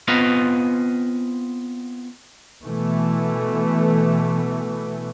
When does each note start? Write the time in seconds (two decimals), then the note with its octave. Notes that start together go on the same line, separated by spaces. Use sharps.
0.08 B3 C4 F4 B4 D#5 F5
2.63 B2 E3 A3